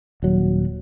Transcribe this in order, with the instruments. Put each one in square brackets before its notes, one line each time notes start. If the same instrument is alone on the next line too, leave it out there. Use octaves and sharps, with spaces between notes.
[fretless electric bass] D#1 F#3